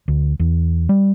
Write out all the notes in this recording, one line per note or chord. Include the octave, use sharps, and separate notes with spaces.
D2
E2
G3